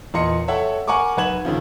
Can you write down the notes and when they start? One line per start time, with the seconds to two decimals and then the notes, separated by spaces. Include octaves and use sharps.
0.14 E2 A#2 D#5 C6 C#7
0.48 A4 C#5 E5 F#5 G5
0.88 A#4 F#5 G#5 A#5 C#6 D6
1.17 B1 B4 F#5 G#6 E7 F#7
1.45 D#2 C#3 F3